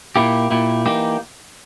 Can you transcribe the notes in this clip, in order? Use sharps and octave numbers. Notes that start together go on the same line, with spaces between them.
A#2 A#3 E4 G4
A#2 A#3 E4 G4
E3 A#3 D#4 G4